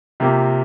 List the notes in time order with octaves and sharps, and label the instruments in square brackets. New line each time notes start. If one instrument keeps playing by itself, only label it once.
[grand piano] C3 F3 A#3 G4